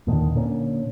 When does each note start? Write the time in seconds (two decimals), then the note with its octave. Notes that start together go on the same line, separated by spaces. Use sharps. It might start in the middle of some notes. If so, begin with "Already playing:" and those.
0.07 D#2 A#2 D3 D#3
0.34 A#2 D3 A#3 C#4